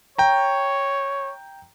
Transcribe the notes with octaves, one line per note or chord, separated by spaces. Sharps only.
C#5 G5 A#5